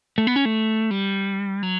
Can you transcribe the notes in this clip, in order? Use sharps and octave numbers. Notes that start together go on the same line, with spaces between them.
A3
B3
C#4
A3
G3
F#3